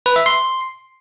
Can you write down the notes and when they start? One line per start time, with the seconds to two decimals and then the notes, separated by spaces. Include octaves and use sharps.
0.06 B4
0.16 E5
0.26 C6